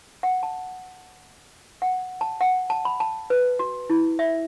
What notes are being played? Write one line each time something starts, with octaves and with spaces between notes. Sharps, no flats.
F#5
A5
F#5
A5
F#5
A5
B5
A5
B4
F#4
E4
E5